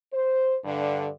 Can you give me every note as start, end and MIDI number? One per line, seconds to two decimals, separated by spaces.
0.13 0.56 72
0.65 1.07 43
0.65 1.07 50